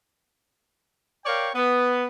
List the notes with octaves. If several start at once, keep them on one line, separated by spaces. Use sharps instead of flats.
A#4 C#5 D5 F5 G5
B3